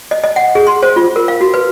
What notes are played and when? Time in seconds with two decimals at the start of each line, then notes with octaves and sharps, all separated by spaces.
0.11 D#5
0.24 D#5
0.36 F#5
0.55 G#4
0.67 C6
0.83 C5
0.96 F4
1.16 A#4
1.28 F5
1.41 F#4
1.54 B4